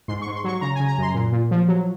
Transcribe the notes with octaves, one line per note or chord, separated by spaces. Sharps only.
G#2 C6
G#2 C#6
C6
F#3 C#6
C#3 A#5
C#3 G#5
A#5
F#2 C6
A#2
A#2
F3
F#3